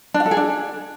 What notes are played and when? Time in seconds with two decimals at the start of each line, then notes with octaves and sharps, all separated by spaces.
0.14 D4
0.20 F5
0.26 A4
0.31 G#4
0.37 D4